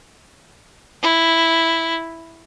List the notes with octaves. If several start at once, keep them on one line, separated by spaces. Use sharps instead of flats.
E4